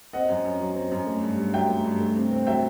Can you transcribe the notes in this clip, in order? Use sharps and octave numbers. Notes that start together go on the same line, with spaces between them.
C4 D#5 F#5
F#2
F#2
F#3
C4
F#2
A3
G2
G2
F#3 E5 G5
A3
G2
A3
C3
C4
F#3 E5 G5